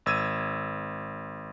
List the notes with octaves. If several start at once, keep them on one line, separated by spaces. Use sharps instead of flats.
G#1 E6 G#6 D#7